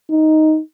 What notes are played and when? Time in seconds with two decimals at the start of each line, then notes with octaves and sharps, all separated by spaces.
0.10 D#4